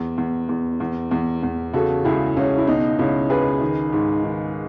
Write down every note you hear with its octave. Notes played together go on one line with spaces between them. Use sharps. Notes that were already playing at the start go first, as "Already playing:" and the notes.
Already playing: E2
E2
E2
E2
E2
E2
C#3 F#4 A4
C#2 E4 G#4
C#2 C#4
E4
B2 D#4
C#2 C#4 E4
C#2 G#4 B4
D#3
G#2
D#3